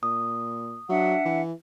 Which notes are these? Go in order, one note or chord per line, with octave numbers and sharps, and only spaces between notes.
A#2 D#6
F#3 D4 E5 F#5
E3